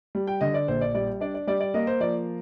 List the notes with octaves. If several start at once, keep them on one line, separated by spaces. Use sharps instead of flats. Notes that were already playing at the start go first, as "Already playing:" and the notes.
G3
G5
D3 D#5
D5
A#1 C5
D5
G3 D5
D4 D5
D5
G3 D5
D5
A#3 D#5
C5
F3 D5